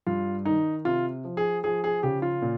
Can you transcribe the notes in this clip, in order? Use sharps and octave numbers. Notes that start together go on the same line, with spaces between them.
G2 F4
D#3 D#4
C3 F4
F3
G#4
F3 G#4
G#4
C#3 G4
F4
A#2